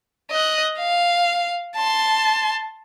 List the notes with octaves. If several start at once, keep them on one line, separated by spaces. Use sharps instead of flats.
D#5 F#6
F5
A5 C6